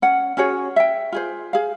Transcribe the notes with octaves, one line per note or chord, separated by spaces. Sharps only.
C#4 F#5
C#4 F#4 G#4 C#5
E5 G5
F4 G#4 C5
G#4 F5